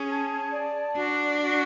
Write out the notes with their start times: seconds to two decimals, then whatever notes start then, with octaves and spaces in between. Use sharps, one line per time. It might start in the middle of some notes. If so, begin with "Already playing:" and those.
Already playing: C#4 G#4
0.09 A5
0.52 D5
0.97 D4 F#4
1.41 F#4